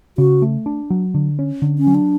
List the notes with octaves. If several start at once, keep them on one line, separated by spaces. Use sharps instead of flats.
C#3 F#4
A3
D4
F#3
D3
C#4
D3
C#4
F#3
D4